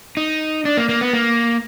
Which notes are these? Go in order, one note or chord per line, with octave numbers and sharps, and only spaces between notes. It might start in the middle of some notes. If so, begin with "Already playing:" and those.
D#4
D4
A#3
A#3
B3
A#3